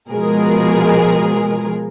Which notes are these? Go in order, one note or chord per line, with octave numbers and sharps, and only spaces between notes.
B2 F3 G#3 G#4 A#4